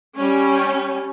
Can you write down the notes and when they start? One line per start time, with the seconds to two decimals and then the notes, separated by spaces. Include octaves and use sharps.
0.15 G3 C#4